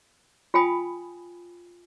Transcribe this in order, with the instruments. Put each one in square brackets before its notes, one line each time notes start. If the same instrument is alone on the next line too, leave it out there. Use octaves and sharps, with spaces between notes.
[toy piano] F4 F5 G5 G#5 B5 D#6